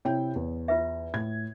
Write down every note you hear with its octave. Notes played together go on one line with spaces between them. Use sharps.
C3 E4 C#5 G5
E2
F4 B4 E5
A2 G#6